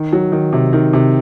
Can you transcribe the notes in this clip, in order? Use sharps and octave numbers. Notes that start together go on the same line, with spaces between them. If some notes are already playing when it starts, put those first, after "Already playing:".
Already playing: D#3
F#3
D#3
C3
D#3
C3